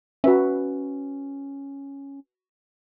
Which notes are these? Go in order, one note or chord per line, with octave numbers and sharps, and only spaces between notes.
C#4 F#4 B4 E5